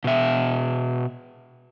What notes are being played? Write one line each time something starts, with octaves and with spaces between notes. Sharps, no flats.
B2 E5